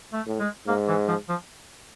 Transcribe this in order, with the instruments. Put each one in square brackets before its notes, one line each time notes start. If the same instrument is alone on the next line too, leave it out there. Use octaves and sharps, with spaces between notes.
[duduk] A3
[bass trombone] A2
[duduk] G#3
[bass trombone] G#2 [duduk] A#3
[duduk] E3
F3
F3